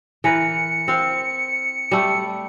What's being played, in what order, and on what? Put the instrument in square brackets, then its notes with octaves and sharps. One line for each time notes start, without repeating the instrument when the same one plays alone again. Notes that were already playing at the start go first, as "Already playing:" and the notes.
[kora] E3 A#4 B4 [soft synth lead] C#7
[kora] C4 F5
G3 A3